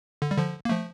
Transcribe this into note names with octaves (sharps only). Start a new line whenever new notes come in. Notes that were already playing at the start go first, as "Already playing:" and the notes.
D3
G3
D3 F3
A#3
F3 A3